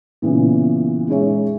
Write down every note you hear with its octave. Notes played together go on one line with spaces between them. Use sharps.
A#2 C#3 E3 B3
G#3 C#4 D#4 G#4 C#5 E5